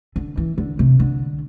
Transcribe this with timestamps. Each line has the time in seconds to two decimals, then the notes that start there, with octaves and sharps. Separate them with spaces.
0.16 D3
0.37 E3
0.58 D3
0.79 C3
1.00 D3